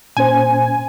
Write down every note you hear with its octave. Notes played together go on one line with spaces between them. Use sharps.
A#2 C#4 C5 G#5